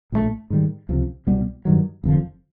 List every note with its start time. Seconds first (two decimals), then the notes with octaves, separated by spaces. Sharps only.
0.12 A#1 A2 F3 A3
0.50 G#2 D#3 G3
0.89 C#2 C3 F3
1.27 C2 B2 G3 B3
1.65 G2 D#3 F#3
2.04 F1 F2 D3 F3